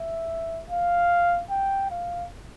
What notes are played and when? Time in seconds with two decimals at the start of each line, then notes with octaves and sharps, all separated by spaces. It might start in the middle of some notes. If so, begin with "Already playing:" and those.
Already playing: E5
0.70 F5
1.50 G5
1.91 F5